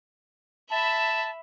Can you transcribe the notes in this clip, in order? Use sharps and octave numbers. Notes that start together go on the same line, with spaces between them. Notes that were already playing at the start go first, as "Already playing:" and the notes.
E5 A5 B5